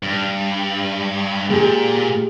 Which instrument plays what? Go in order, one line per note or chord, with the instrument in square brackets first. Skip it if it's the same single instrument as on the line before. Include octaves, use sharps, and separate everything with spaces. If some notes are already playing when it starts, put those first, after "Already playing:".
[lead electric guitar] G2
[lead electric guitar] A#2 [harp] G#3 G4 G#4